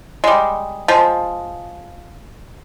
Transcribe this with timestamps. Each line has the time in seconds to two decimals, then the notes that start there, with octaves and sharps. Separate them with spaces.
0.24 G3 G#3
0.88 F3 G#3